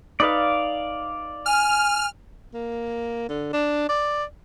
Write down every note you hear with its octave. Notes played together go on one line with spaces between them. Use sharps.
D#4 B4 D5 F5
G#5 F6
A#3
D3
D4
D5